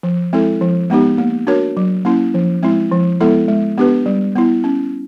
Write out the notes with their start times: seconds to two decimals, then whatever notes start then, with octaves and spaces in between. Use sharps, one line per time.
0.03 F3
0.33 G#3 C4 E4 A4
0.61 F3
0.90 G#3 B3 D#4 G4
1.18 A#3
1.47 D4 F#4 A#4 C#5
1.77 F#3
2.05 A#3 C#4 E4
2.34 F3
2.63 G#3 C4 E4
2.92 F3
3.20 G#3 B3 E4 A4
3.48 G#3
3.78 B3 D4 G4 B4
4.06 G3
4.36 B3 E4
4.64 C#4